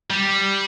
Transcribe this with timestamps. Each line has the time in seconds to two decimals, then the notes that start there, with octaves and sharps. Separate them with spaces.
0.10 G3